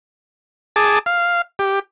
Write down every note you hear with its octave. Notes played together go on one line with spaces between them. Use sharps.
G#4 A5 D6
F5
G4